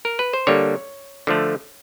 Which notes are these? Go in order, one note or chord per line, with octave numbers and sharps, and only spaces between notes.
A#4
B4
C5
D3 G3 A#3 C#5
D3 F3 A3